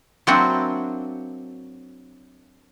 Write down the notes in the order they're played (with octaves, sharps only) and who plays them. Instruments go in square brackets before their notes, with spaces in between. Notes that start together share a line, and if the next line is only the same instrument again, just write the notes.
[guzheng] F#3 A#3 C4 D4 E4 F#4